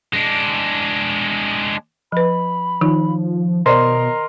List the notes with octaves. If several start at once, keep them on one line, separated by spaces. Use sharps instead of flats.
G#3 D4
F3 B4 B5
D#3 F3 D#4
B2 A#4 C5 D5 D#5 A#5 C6